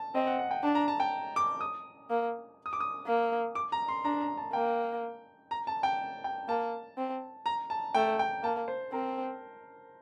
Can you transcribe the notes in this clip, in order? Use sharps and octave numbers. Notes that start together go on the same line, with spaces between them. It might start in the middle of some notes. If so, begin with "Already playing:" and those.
Already playing: A5
C4 D#5
F#5
F#5
G5
D4 A5
A#5
A5
G5
D6
D#6
A#3
D#6
D6
D#6
A#3
D6
A#5
C6
D4 A#5
A#5
A5
A#3 G5
A#5
A5
G5
G5
A#3 A5
C4
A#5
A5
A3 G5
G5
A#3 A5
C5
C4 A#4